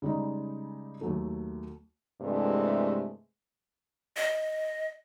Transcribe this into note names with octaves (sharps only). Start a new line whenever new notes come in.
C#3 G3 G#3 D#4
D#2 F#3 A3
G2 C3 E3 G#3 A3
D#5